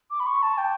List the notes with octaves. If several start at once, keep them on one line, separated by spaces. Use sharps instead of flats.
D6
B5
C#6
A5
G5